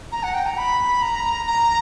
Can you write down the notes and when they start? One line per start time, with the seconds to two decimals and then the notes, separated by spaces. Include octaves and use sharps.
0.12 A#5
0.23 F#5
0.34 G5
0.46 A#5
0.58 B5
1.02 A#5
1.46 A#5